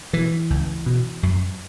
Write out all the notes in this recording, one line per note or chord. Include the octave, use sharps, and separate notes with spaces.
B2 E3
C#2
B2
F#2